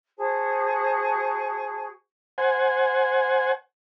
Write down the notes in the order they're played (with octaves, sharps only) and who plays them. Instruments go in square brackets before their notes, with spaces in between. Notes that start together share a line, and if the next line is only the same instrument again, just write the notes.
[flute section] F#4 G#4 C5 A5
[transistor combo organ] C5 F#5 G#5